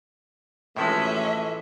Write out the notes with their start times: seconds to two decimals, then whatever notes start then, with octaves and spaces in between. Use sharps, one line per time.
0.76 A2 E3 F3 G#3 A3 C#4 F#4 E5